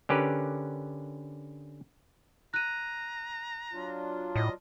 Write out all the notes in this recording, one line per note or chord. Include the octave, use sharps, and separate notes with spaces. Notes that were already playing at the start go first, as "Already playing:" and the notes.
D3 C#4 G4 A#4 B4
A#5 F#6 D#7
F#3 D4 F4
A2 D#5